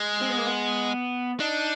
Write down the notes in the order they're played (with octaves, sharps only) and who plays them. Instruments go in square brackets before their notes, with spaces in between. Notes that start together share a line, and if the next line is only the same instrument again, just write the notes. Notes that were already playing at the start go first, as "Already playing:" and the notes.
Already playing: [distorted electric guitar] G#3
[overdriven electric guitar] C4
B3
A#3
B3
[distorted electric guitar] D4 [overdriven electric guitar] D#4